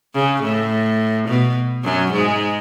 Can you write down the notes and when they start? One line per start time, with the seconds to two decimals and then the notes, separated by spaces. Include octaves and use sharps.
0.15 C#3
0.43 A2
1.28 B2
1.85 F#2 F#3
2.13 G#2 G#3